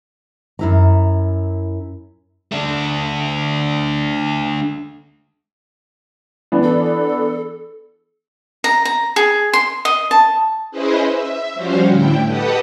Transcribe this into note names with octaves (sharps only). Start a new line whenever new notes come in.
F#2 E4 A#5
A3 D4
E3 B3 D4
A4
A#5
A#5
G#4
C6
D#5
A5
C#4 E4 G#4 B4 C5 D#5
E5
F3 G3 C#4 F#4 C5 F5
A2 D3 E4 G5
G4 A4 B4 D#5 F#5 D#6